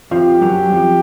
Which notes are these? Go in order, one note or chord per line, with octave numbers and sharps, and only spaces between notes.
F2 F3 G4
F#2 F#3
F2 F3